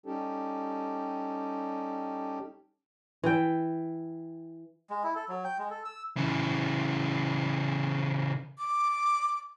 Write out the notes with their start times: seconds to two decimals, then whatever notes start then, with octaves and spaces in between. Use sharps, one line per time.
0.06 G3 C#4 D#4 G4 A4
3.24 E3 G5
4.90 G#3
5.04 E4
5.15 A4
5.29 F#3
5.44 G5
5.59 G#3
5.70 A4
5.85 E6
6.17 C#3 E3
8.58 D6